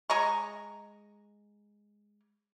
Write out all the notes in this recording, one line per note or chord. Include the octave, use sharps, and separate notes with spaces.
G#3 D#5 A#5 C#6